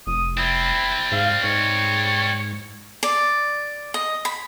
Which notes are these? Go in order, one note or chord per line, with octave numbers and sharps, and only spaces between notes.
F1 D#6
G3 C4 E4
G#2 F5
G#2 C#5
D5
D#5
B5